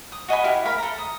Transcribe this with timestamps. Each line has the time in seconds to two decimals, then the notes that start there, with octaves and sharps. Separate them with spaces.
0.12 D#6
0.28 F#4 D#5 G#5 B5
0.44 E4 F#4 G4 F5
0.65 E4 A#4 F5 B5
0.78 A4 A#5
0.98 D#6